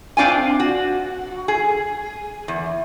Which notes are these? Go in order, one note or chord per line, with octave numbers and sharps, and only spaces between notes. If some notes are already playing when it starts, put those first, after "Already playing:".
C4 D4 F4 G#5
F#4
G#4
E2